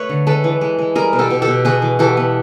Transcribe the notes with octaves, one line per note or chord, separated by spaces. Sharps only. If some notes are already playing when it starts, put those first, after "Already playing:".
Already playing: A3 B4 C#5
D3
G#3 A4 B4
E3
G#3
G#3
G3 G#4 A#4
B2
G4 A4
B2
G4 A4
B2
B3 F#4 G#4
E3
E3 G4 A4
B3